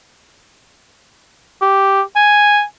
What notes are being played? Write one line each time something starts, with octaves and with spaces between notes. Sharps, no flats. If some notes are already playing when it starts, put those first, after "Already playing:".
G4
G#5